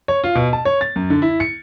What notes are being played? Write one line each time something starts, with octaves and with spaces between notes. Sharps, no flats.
C#5
F4
B2
A5
C#5
A6
F#2
D3
E4
C#7